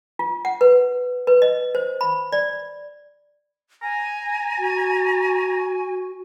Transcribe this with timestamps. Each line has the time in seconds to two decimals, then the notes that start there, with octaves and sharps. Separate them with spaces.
0.19 F4
0.45 F#5
0.61 B4
1.27 B4
1.42 D#5
1.75 C5
2.01 B5
2.32 D5
3.82 G#5 A#5
4.59 F#4